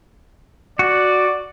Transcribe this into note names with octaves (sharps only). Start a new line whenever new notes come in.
F#4 D5